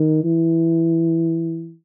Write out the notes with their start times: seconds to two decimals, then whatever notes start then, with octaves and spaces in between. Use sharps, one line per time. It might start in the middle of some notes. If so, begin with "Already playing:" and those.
Already playing: D#3
0.24 E3